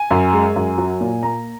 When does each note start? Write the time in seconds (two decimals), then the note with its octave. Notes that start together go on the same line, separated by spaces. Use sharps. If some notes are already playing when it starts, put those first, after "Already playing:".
Already playing: G#5
0.11 F#2
0.33 G#3
0.56 F#2
0.78 F#3
1.01 A#2
1.23 A#3 A#5